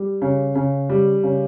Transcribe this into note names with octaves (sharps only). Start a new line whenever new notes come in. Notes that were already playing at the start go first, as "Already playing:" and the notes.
Already playing: G3
C#3
C#3
G3
C#3